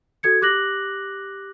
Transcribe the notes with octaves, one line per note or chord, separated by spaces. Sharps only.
F#4 A4 G#6 C#7
G4 D6 F#6 A#6 F#7